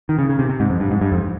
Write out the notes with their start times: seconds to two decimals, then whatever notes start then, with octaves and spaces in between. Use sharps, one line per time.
0.09 D#3
0.19 C#3
0.30 C#3
0.39 C3
0.50 C3
0.60 G#2
0.70 F2
0.80 G2
0.91 G#2
1.01 G2
1.12 F2